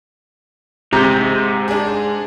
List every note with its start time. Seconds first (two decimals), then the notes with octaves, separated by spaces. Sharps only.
0.93 G#2 C3 A#5 G6
1.68 D4 G#4